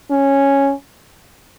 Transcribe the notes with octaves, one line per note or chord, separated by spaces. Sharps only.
C#4